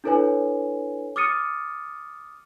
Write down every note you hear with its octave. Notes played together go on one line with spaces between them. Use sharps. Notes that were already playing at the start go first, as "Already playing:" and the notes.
D4 E4 A4 B4 C#5 G#5
D6 D#6 F6 A6 C#7 D#7